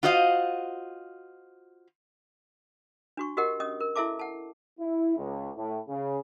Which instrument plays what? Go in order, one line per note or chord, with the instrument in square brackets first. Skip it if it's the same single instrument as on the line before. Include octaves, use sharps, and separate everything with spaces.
[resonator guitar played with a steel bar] F4 F#4 C5 D#5 F5
[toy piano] D4 F#4 C#6
F#4 G4 A#4 D#5 F#5
C#4 D#5 D#6
A#4
E4 A4 E5 A5 D6
F#5 A5
[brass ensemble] E4
C#2
A2
C#3